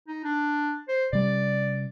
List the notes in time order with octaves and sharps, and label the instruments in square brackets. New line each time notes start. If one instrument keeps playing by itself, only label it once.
[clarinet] D#4
D4
C5
[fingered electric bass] C3 G3 C#4 [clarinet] D5